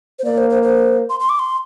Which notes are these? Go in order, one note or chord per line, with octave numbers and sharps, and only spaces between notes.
C5
A#3 D5
C5
C5
C5
C6
C6
D6
C6